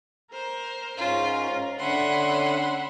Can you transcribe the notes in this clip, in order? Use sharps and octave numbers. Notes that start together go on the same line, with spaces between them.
A#4 C5
G#2 C#4 F4 A#4
D3 C#4 E5 F#5 B5 C6